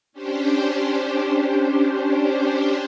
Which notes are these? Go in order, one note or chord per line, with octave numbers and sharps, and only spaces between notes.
C#4 D4 G4 C5